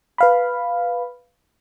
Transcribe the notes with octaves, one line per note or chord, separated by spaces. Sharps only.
B4 F5 B5